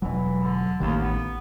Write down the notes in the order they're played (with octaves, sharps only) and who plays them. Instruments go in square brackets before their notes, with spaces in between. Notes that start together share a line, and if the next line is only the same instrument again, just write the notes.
[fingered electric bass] E1 F#3 [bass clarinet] E3
[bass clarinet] D3
[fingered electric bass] A1 D#3 [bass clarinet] D#2
[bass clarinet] B3